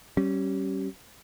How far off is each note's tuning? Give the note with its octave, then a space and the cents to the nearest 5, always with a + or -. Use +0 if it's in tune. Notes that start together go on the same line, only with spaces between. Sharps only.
G3 -25 C#4 -10